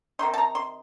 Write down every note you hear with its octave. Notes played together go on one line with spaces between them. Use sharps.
C3 D#3 A3 D#4 C6
A5
A#5
C6